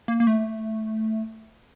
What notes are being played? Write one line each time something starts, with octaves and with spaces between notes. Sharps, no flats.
A#3
A#3
A3